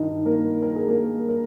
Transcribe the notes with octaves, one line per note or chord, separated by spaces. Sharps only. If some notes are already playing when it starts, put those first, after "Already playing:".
Already playing: G2 D#3 D#4
A#3 A#4
A#4
G#4
A#3 A#4
A#4